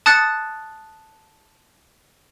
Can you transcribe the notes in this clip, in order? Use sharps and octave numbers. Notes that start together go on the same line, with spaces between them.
A5 D#6 F#6 A6 C#7